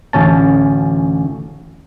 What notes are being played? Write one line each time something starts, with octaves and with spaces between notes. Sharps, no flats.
A1 D2 C#4 A5